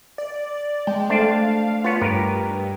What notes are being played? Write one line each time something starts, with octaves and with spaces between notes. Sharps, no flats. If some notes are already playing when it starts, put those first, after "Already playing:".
D5
G#3 G5
A3 D4 C5 D5 F5
B3 F4 C#5
G2 G4 A#4 B4